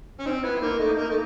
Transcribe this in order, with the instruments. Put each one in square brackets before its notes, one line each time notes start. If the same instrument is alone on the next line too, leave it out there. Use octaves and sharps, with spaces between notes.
[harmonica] C#4
[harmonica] C4 [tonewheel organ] D#4
[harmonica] B3 [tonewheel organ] E4
[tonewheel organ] E4
[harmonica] A#3 [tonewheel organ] D#4
[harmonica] A3 [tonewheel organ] D#4
[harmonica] A#3
A3